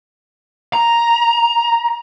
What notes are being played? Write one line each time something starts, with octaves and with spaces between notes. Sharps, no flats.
A#5